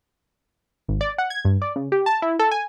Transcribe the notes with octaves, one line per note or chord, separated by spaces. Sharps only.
G#1
D5
F#5
G#6
G2
D5
C#3
G4
A5
E4
A4
G#5